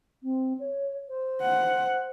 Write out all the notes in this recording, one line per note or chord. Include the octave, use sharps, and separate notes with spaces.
C4
C#5
C5
F#5